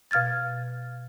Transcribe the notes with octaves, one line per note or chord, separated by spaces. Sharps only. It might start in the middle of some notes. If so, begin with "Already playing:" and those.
B2 F5 F6 G#6 A6